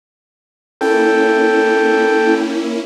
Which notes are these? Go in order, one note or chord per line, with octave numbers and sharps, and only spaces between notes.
A#3 C#4 E4 A4 G5